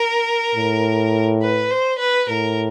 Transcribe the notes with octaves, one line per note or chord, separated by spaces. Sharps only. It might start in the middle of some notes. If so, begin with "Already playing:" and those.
Already playing: A#4
A2
B4
C5
B4
A2 A#4